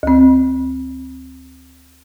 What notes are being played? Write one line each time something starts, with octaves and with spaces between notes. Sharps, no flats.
D2 C4